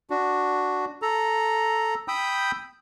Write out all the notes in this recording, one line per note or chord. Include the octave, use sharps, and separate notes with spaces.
D4 F#4
A4 A#5
G5 B5 D#6 E6 G6